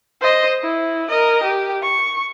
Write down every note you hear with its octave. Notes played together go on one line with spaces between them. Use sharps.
C5 D#5
E4
A#4 D#5
G4
C#6